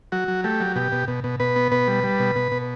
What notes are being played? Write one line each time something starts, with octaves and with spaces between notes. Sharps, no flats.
F#3 F#4
F#3
A3 G4
F#3
B2 G4
B2
B2
B2
B2 B4
B3
B2 B4
G3
G3
B2
B2
B2